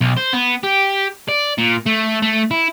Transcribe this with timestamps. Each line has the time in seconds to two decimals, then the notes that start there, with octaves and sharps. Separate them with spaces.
0.01 B1
0.17 C5
0.34 B3
0.64 G4
1.28 D5
1.58 A#2
1.86 A3
2.22 A3
2.51 E4